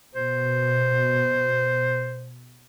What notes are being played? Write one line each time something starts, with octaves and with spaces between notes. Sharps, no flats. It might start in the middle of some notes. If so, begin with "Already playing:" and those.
B2 C5